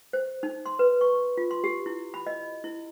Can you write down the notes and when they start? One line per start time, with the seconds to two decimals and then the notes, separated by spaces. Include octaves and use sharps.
0.13 C5
0.43 D#4
0.66 C6
0.79 B4
1.01 C#6
1.37 F4
1.51 C6
1.64 G4
1.86 E4
2.14 B5
2.27 D#5
2.64 E4